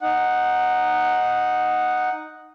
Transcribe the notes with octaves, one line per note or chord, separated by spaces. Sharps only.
D#4 F#5